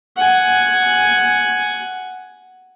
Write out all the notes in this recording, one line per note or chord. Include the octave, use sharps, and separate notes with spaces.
F#5 G#5